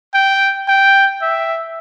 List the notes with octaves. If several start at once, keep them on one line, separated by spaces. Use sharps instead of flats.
G5
G5
E5